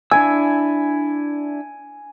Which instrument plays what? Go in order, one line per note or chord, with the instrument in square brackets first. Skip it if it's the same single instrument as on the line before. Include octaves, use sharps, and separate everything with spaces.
[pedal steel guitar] D4 E4 E6 [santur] G#5